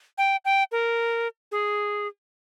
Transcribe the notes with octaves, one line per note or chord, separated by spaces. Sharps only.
G5
G5
A#4
G#4